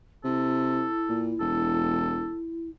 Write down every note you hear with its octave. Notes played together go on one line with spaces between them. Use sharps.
C3 E4 A4
A#2
E1 A4